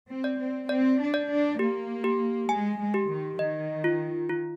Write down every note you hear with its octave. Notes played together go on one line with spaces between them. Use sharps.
C4
D5
C4
C4 D5
D4
D5
D4
A#3 G4
G4
G#3 G#5
G#3
G4
D#3
D#3 D#5
F4
F4